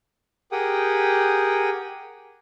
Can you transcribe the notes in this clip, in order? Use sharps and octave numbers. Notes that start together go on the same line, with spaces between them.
G4 G#4 A#4 F#5 G5 D#6